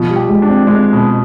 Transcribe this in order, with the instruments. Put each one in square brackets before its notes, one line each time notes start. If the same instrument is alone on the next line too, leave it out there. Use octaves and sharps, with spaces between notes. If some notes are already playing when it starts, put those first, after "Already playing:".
Already playing: [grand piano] B2 [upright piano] F3
[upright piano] G3
[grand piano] G4
[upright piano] G#3
[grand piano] D4
[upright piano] C4
[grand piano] G#3 [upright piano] C4
[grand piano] B2